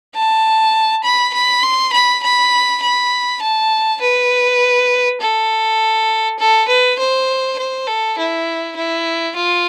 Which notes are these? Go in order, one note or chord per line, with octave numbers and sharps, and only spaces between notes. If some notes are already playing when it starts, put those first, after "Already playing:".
A5
B5
B5
C6
B5
B5
B5
A5
B4
A4
A4
B4
C5
C5
A4
E4
E4
F4